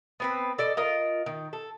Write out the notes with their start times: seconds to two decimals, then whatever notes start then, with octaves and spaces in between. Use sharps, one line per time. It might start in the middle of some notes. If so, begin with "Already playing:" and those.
0.20 B3 C4 B4
0.58 A4 D5 D#5
0.77 F4 A#4 D#5
1.26 D#3
1.53 A4